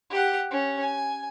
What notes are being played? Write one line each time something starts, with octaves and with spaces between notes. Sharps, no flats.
G4 F#5
C#4
G#5